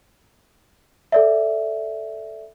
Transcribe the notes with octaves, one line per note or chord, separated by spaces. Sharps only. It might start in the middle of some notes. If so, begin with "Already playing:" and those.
A4 D5 E5